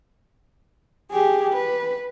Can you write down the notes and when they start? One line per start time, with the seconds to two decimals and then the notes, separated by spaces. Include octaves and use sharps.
1.12 G4 G#4
1.53 B4